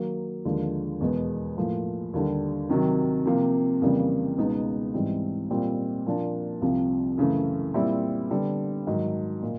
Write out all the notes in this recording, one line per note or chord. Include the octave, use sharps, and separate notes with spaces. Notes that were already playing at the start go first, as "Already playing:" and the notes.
Already playing: D#3 F#3 A#3
D#2 D3 F3 G#3
E2 B2 G#3 B3
A2 F3 A#3
D#2 D3 G3
C3 D#3 F#3
C3 F3 A#3
F2 C#3 E3 G3 A#3
C#2 B2 G#3 B3 D#4
G#2 E3 G3 C4
A#2 G3 C4 F4
A#2 F3 A#3 D4
C2 C3 F3
F#2 C#3 E3 A3
A#2 G3 C4 E4
D3 G3 B3
G#2 D#3 F#3
A#2